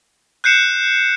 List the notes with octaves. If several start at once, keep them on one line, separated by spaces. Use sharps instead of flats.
F#6 G6 C7 C#7 E7